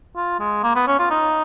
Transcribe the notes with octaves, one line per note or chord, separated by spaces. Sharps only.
F4
G#3
A#3
B3
C#4
F4
D#4